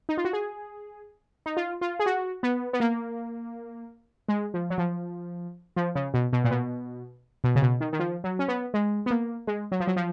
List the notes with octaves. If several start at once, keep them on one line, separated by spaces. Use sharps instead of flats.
D#4
F4
F#4
G#4
D#4
F4
F4
G#4
F#4
B3
B3
A#3
G#3
F3
F#3
F3
F3
C#3
B2
B2
A#2
B2
B2
C#3
B2
D#3
D#3
F3
F#3
C#4
B3
G#3
B3
A#3
G#3
F#3
F3
F#3
F3